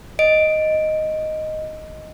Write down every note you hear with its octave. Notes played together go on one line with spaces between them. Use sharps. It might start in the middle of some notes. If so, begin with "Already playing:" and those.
D#5 D7